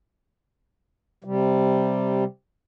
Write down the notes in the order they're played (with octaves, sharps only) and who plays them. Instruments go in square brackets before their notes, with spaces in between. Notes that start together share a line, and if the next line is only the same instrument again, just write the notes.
[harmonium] C3 G3